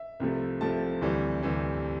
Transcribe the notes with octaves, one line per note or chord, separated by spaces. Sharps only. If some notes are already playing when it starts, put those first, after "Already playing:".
Already playing: E5
C2 C3 F3 A3
C2 C3 F3 A3 A5
D2 C3 E3 G3
D2 C3 E3 G3